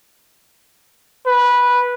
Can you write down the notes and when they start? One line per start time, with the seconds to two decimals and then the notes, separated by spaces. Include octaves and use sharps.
1.26 B4